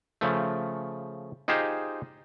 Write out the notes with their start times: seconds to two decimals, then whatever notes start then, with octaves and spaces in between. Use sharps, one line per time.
0.21 C#3 F3 A3
1.48 D#4 F4 G4 G#4 C5